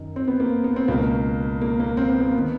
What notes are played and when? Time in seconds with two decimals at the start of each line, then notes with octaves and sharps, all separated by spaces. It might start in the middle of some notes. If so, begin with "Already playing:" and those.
Already playing: F#2 D#3
0.16 C4
0.28 B3
0.40 A#3
0.64 B3
0.76 C4
0.88 C#2 B2 A#3
1.61 A#3
1.80 A#3
1.97 C4
2.09 B3
2.20 A#3
2.32 B3
2.38 D#3